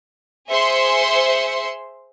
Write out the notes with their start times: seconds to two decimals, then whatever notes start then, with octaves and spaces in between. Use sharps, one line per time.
0.49 G#4 C5 E5 C6 C#7